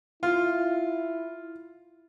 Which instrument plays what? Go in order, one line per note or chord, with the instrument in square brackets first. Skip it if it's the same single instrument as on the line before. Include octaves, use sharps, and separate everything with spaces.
[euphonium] E4 [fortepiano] F4